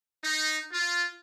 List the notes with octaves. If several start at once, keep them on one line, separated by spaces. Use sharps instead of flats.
D#4
F4